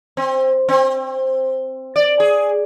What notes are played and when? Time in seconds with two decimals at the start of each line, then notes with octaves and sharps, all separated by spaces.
0.17 C4
0.69 C4
1.96 D5
2.20 G#4